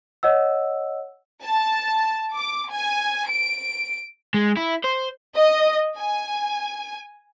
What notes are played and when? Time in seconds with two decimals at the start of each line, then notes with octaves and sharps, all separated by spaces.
0.23 C#5 D#5 F#5 E6
1.44 A5
2.34 D6
2.70 G#5
3.28 D7
4.34 G#3
4.57 E4
4.84 C5
5.35 D#5
5.97 G#5